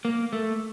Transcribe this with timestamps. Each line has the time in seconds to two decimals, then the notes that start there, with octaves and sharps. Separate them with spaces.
0.05 A#3
0.33 A3